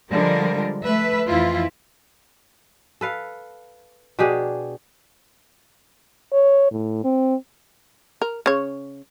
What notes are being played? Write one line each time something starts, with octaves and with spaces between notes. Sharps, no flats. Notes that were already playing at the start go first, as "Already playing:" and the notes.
D3 F3 G3 G#3 A#4
A3 B4 E5
F2 E3 E4 F4
A4 B4 F5
B2 D4 G4 G#4
C#5
A2
C4
A#4
C#3 C#5